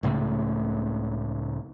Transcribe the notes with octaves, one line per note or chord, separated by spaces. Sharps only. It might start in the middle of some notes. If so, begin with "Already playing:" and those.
C#2 A2 C#3 A3